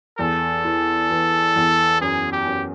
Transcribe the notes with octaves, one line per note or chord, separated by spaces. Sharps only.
E2 A4
E3
E3
E2
F#2 G#4
G4
F#2